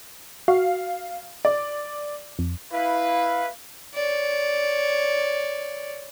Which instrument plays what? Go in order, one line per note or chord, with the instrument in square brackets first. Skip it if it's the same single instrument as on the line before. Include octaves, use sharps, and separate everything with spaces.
[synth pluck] F#4 [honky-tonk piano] F5
[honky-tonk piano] D5
[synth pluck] F2
[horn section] E4 B4 [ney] F5
[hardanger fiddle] C#5 D5